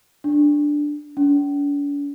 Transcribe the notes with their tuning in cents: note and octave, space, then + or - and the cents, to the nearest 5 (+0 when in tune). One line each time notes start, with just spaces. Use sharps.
D4 +0
D4 -45